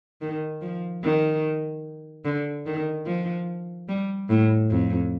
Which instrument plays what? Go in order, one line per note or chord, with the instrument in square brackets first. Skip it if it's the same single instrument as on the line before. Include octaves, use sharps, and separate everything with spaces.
[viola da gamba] D#3
F3
D#3
D3
D#3
F3
G3
A2
F2